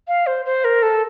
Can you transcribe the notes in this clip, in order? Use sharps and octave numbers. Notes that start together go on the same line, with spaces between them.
F5
C5
C5
A#4
A4